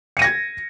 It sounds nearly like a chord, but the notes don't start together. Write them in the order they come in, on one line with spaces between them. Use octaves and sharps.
C#7 D#7 A#6 G#6